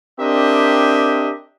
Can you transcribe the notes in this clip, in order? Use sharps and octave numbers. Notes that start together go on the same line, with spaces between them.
C4 D4 G4 A#4 D#5 E5